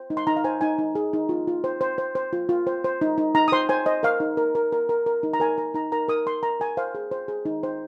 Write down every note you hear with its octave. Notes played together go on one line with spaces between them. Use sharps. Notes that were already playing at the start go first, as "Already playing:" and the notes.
Already playing: C5
D#4
C6
D#4 A#5
F5
C5 G#5
D#4 G#5
D#4
G#4
D#4
F4
F4
C5
C5
C5
C5
F4
F4
C5
C5
D#4
D#4
D#4 A#5
D#6
C5 C6
C5 G#5
C5 D#5
A#4 F5
D#4
A#4
A#4
A#4
A#4
A#4
D#4
A#5
A#4 G#5
A#4 A#5
D#4 A#5
A#4 A#5
A#4 D#6
A#4 C6
A#4 A#5
A#4 G#5
C5 F5
G#4
C5
G#4
D#4
C5